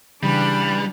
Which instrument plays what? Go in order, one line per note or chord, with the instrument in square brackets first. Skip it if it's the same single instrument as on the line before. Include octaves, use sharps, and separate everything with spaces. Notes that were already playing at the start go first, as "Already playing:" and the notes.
[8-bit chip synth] C#3 E3 [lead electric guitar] G3 [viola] D4 [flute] B5